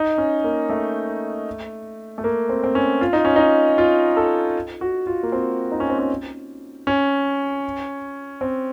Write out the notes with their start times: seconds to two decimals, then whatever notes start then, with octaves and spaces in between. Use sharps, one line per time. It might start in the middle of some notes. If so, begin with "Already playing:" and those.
Already playing: D#4
0.18 C#4
0.44 A#3
0.70 A3
2.18 A3
2.24 A#3
2.49 C4
2.64 C4
2.75 C#4
3.01 F4
3.13 D#4
3.25 C#4
3.36 D#4
3.78 F4
4.17 A4
4.81 F#4
5.07 F4
5.23 A#3
5.32 C4
5.72 D#4
5.80 C#4
5.89 C4
5.99 C#4
6.87 C#4
8.41 C4